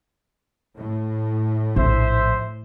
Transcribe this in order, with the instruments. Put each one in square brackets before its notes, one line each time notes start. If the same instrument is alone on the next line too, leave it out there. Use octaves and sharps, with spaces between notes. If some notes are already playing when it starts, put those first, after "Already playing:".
[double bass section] A2
[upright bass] A#1 [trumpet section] C5 E5